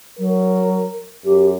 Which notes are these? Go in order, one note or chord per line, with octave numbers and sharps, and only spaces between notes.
F#3 A#4
F#2 G4